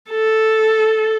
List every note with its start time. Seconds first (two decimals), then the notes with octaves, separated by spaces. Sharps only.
0.10 A4